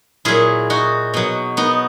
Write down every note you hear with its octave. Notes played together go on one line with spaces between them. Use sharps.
A#2 F#3 E4 G#4
D#4 F#4
B2 F#3
B3 D#4